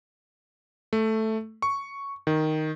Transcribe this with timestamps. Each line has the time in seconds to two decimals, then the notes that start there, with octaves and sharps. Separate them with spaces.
0.93 A3
1.62 C#6
2.27 D#3